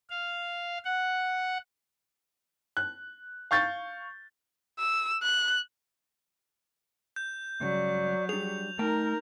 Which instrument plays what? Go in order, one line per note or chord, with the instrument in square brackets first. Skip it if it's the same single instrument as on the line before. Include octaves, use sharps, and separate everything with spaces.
[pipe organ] F5
F#5
[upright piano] F#6
F5 C#6 G6 A6
[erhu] E6
F#6
[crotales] G6
[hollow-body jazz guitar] C#2 G2 C#3 [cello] F#3 [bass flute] D5
[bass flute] G3 [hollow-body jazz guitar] D4 G#4 [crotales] F7
[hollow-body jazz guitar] A3 G5 A5 [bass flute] D#4 [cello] A#4